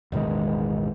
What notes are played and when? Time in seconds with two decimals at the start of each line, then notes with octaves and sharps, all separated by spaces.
0.12 E1 A1 D#3 G#3